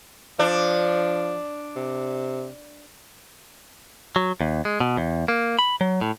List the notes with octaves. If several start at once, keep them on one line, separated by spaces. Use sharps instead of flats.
F3 D4
C3
F#3
D#2
G#3
B2
E2
A#3
B5
F#3
A2